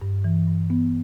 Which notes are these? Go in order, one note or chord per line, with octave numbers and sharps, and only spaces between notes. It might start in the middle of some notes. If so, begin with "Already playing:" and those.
G2
E3
G2
B3